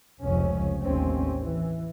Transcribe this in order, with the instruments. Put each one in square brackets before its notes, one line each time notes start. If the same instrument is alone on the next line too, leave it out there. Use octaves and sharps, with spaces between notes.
[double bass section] F1 C#2 F3 C#4
A1 D#2 C4 C#4
E3